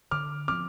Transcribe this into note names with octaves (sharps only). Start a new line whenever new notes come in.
D3 D6 F6
F3 C4 D6 F6